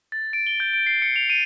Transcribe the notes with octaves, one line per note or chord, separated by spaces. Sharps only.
A6
D7
G7
G6
D7
C7
C#7
F7
D#7